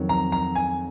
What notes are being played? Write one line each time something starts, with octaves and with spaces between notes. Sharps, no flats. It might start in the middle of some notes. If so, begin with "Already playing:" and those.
Already playing: F2 D#3 F#3
A#5
A#5
G#5